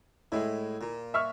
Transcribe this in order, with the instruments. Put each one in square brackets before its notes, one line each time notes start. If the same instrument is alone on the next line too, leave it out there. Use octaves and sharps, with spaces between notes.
[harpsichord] A2 G#3 [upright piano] E4
[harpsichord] A#2
[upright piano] E5 C#6 F6